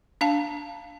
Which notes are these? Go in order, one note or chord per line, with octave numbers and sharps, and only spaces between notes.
D4 F5 A5